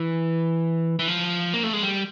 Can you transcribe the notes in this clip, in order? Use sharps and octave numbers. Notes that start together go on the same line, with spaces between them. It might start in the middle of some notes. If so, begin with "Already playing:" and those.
Already playing: E3
E3
F3
A#3
A3
G#3
G3